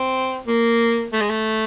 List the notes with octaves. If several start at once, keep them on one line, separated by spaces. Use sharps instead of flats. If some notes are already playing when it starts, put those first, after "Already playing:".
Already playing: C4
A#3
A3
G#3
A3